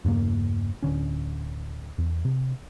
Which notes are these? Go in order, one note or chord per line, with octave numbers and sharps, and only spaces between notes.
E2 G2 C#3 A#3
D1 C2 D3 C#4
E2
C3